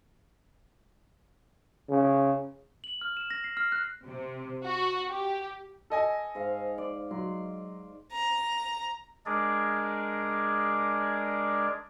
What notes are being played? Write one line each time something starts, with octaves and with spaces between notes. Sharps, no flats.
C#3
F#7
F6
E7
A#6
C7
F6
F#6
C3
F#4
G4
A4 D#5 G#5
G#2 F5
D5
F#3 C6
A#5
G#3 D4 G#4 A#4 D5